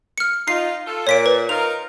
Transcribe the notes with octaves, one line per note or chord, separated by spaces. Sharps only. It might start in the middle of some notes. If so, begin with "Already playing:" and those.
F6 C#7
D#4 F4 C7
F4 A4
A#2 C#5 B6 D7
B4
D#4 F4 A#4 F7